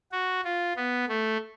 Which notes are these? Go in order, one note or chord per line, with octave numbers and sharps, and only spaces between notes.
F#4
F4
B3
A3